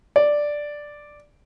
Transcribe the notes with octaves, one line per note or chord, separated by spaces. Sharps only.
D5